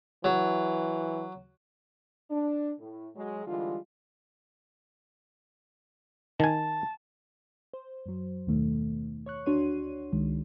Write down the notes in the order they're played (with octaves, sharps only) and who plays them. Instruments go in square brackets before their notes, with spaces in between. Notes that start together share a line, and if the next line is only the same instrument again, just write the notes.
[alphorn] E3 [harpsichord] F#3
[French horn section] D4
A2
F#3 G#3
D3 E3 G3 G#3 F4
[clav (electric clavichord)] D#3 G#5 [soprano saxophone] A5
[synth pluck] C5
F#2 F#3
D#2 B2 D#3 A3
C#5 C#6 F#6
D2 D4 F#4 C#5 C6 D#7
C#2 D#3 G#3